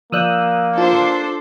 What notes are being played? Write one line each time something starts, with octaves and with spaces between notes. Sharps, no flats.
F3 A#3 D5 D#6 E6 F#6 G6
D4 F4 A4 C5